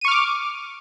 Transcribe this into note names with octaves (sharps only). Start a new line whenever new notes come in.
C#6 D6 F6 D#7